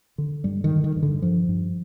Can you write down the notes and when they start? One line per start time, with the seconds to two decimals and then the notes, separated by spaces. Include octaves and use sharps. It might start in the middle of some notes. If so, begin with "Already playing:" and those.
0.18 D3
0.44 G2 G3
0.64 D#3
0.71 D3
0.84 D#3
0.96 G2
1.03 D3
1.22 G2 F3
1.49 G2